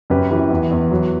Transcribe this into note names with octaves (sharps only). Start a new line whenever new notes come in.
F#2 G4 B4
E3 G4 B4
E2
E2
F#3